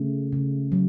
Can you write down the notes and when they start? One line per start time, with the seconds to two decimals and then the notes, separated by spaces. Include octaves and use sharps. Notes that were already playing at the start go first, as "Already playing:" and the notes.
Already playing: C#3 A3
0.32 C#3
0.72 F#3